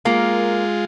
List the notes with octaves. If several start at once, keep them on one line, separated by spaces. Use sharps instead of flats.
G#3 A#3 F4 A#4